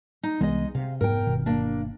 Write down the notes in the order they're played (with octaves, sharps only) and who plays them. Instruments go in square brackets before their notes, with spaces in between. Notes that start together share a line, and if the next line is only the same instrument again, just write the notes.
[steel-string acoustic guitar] D#4
[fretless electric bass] C2 E3 B3 [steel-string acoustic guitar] G#3 D#5
[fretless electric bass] C3 [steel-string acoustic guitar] F5
[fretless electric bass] F1 G#2 B3 [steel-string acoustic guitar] A#4 G5
[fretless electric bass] G1 B2 D#3
[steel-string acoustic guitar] A#3 D4